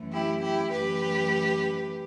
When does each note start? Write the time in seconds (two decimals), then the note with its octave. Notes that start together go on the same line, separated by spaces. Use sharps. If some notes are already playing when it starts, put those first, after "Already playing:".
Already playing: F#2 E3 A3
0.13 E4 G4
0.43 E4 G4
0.73 F#2 E3 A3 G4 B4